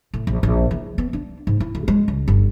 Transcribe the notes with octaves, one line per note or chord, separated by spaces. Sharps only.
A2
A#1
A#1
E3
B3
D4
G#2
E4
D2
G#3
C#2
G1